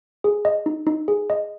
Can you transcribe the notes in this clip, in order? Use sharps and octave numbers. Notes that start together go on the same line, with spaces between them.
G#4
D#5
D#4
D#4
G#4
D#5